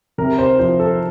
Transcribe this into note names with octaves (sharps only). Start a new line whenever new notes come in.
C3 A#4
C5
F3 C5
A4